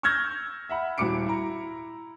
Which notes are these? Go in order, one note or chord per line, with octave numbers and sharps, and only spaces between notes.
C#6 E6 F6 G6 G#6 A#6
E5 F#5 B5
D#1 E4 F#4 D6 C#7 D7
E4 A#5